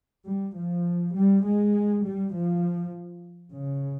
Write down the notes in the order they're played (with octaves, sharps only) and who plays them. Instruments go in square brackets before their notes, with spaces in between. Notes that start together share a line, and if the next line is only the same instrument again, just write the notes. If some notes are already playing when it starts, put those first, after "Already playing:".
[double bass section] G3
F3
G3
G#3
G3
F3
C#3